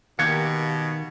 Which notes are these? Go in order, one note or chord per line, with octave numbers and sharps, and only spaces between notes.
B2 D#3 A#3 G4 G#6 C#7